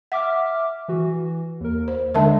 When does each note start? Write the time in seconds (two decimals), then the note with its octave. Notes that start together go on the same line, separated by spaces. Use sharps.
0.12 E5 F#5 D6 F6
0.88 E3 F#4
1.60 D#2 A#4
1.88 C5
2.14 D3 G#3 D4 A#4 E5 A5